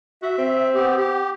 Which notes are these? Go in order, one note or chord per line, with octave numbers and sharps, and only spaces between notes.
F#4 E5
C4
B3 G4
G4